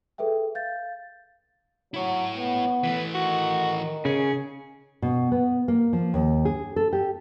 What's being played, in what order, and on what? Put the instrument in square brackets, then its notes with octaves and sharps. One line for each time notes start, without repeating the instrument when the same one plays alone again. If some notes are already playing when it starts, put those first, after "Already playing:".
[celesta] G#4 A4 B4 E5 G5
F5 G6 A6
[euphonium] F#3 [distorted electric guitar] E4 C#5
[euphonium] B3
[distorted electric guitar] E3 A3 [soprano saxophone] B4
[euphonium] D#3 [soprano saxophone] F#4
[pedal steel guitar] C#3 C#4 [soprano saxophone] G#4
[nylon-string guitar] B2
B3
A#3
F3
D#2
G#4
A4
G4